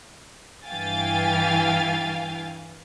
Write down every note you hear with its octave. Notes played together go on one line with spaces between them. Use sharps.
G2 E3 F5 G5 G#5 A6